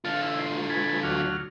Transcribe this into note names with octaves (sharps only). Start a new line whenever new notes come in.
D3 F4 A4 F5
E4
C6
G#5 A5 B5
D2 F#3 F6